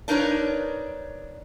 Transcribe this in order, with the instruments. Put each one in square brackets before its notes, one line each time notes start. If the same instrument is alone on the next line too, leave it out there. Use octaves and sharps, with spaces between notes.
[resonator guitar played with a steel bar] D4 D#4 A#4 B4 C#5